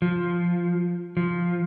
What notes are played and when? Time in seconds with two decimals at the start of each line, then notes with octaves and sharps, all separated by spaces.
0.02 F3
1.17 F3